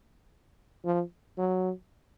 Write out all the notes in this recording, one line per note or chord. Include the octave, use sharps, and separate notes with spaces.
F3
F#3